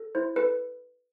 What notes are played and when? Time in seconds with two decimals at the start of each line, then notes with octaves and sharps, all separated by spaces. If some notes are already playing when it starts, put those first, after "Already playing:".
Already playing: A4
0.15 E4 C5
0.36 A4 B4